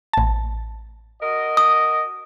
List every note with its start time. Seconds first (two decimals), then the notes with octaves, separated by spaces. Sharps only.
0.13 A1 A5
1.22 F#4 A#4 D#5
1.57 D#6